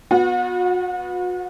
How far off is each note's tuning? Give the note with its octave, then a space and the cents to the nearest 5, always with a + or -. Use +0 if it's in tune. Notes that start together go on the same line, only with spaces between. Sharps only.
B3 +0 F#4 -40